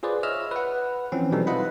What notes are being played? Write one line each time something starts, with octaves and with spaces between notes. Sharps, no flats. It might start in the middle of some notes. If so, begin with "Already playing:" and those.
F4 G#4 B4 C5 D5
C#5 D#5 E5 E6 F6
B4 F#5
E3 F3 C4 C#4
B2 E3 F#3 G3 D#4 A4
E4 F4 B4 D#5 F#5 B5